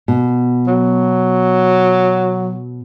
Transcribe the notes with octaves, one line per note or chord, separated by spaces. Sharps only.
B2
F#3